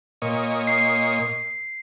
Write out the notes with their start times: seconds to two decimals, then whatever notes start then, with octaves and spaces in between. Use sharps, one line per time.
0.22 A#2 C#5 D#5
0.67 C7